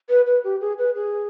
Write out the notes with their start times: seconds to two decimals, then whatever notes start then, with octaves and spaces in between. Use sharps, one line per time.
0.09 B4
0.27 B4
0.44 G4
0.61 G#4
0.78 B4
0.96 G#4